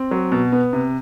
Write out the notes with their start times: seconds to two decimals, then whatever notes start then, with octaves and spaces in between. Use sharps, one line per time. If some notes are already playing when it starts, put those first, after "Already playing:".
Already playing: C4
0.11 F#3
0.32 B2
0.52 B3
0.73 C3